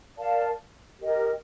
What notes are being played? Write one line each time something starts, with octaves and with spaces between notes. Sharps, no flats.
A#4 D5 F5 A5
G4 A#4 D#5 G5